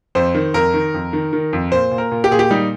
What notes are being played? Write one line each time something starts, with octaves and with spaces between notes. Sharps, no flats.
F2 C5
D#3
F2 A#4
D#3
F2
D#3
D#3
F2
A#2 C5
A#2
A#4
A#2
G4
A#2 G#4
G4
G3 D#4